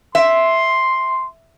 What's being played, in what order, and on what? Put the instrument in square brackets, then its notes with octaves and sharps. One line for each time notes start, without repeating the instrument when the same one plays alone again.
[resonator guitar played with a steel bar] E5 [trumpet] C6